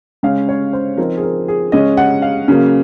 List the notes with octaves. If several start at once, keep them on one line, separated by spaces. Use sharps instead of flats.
C#3 G#3 C#4 F5
C#5
C5
F3 C4 D#4 A#4
G#4
A#4
G#4
C#3 G#3 C#4 D#5
F#5
F5
C#3 F#3 A#3